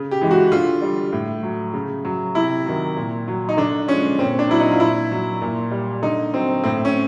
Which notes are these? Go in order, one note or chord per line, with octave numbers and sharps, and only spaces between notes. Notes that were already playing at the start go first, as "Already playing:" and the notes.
Already playing: C#3
G4
E3 G#3
F#4
D3 F4
G3
A2
F#3
C#3
F#3
C3 E4
D#3 F#3
A#2
F#3
D#4
D3 D4
F3 G#3 C#4
A#2 C4
D4
F#3 E4
D#4
F4
A#2 E4
F#3
A#2
G3
D3 D#4
F#3 C4
A2 C4
C#4